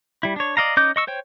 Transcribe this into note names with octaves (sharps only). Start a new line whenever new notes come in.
G3 E4
D4 C#5
D5 D#5 F5 A#5
C#4 D#4 D#5 D6 G6
D#5 C#6 E6
C5 C#5 G5